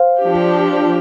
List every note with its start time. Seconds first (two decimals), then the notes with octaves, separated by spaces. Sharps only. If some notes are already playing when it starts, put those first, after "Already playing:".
Already playing: C5 F5
0.22 F3 D4 G4